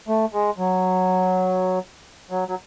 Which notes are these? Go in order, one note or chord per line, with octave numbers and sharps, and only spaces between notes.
A3
G#3
F#3
F#3
F#3